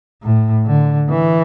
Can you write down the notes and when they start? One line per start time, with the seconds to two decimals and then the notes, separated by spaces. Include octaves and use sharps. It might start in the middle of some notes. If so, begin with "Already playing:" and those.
0.23 A2
0.66 D3
1.10 E3